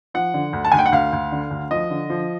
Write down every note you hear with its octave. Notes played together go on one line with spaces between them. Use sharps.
F3 F#5
D3
D2
A5
D2 G#5
G5
F#5
D2 F5
D2
D3
D2
F3 D#5
D3
F3